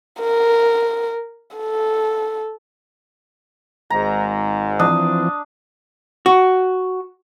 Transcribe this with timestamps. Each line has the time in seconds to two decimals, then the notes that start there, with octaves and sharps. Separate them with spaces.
0.20 A#4
1.57 A4
3.90 G#1 G#2 A#5
4.80 E3 F3 C4 D4 D#6
6.26 F#4